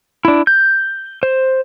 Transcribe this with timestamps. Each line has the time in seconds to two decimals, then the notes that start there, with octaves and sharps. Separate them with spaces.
0.25 D4 E4
0.47 G6
1.23 C5